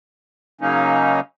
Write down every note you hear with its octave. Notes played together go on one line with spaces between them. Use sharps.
C#3 F#3 A#3 C#4 D#4